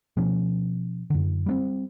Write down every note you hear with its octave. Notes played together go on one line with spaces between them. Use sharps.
B2 F3 C#4
F#2 D3
G3 A#3 C4